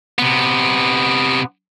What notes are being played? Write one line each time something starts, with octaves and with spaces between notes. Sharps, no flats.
C3 B3